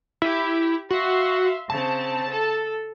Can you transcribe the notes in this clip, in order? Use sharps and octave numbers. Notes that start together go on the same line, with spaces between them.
E4 G4
F#4 E5 F5 C6
C#3 C4 A5
A4